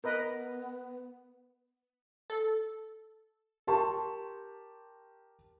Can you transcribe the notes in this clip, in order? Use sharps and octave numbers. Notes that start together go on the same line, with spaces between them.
B3 A#4 B4 D#5
A4
G4 A#4 A5 C6 C#6